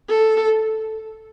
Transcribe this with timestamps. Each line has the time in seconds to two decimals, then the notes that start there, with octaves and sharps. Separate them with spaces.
0.09 A4